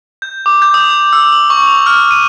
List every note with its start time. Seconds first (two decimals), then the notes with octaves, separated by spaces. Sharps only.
0.22 G6
0.46 D6
0.62 G6
0.74 D#6
0.90 G6
1.13 E6
1.32 F#7
1.50 C#6
1.67 F7
1.86 F6
2.11 D#7